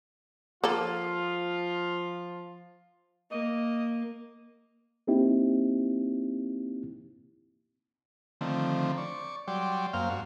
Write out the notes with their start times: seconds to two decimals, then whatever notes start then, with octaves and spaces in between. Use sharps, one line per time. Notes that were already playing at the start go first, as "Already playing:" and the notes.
0.64 F3 A#3 F4 A4
3.31 A#3 D#5
5.07 A#3 C4 D#4 E4 G4
8.41 D3 D#3 F3 A3 C4
8.98 D5 C#6
9.48 F#3 G3 D5 G5 C6
9.93 F#2 A#3 C5 F5 F6
10.10 G2 F#4